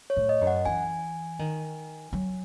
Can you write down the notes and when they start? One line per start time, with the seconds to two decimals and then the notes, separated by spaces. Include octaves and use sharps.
0.10 C#5
0.17 A2
0.29 D#5
0.41 F#2
0.47 F#5
0.65 E3 G#5
1.39 D#3
2.13 F#3